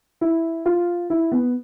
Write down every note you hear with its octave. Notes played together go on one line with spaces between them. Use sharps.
E4
F4
E4
B3